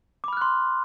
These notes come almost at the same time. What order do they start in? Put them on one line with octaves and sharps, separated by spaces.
D6 B5 F6 F#6 C6